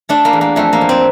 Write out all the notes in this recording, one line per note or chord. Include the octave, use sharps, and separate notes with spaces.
A3 D4
A#3
E2
A#3
F2 A3
A#3
F2
C4